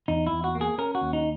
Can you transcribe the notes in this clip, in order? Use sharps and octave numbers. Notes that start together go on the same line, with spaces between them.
E2 D#4
E4
E2
F#4
A#3
G#4
C#4 A#4
F#4
D#2
D#4